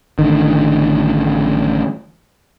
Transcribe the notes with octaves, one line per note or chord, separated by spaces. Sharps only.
A1 D3 D#3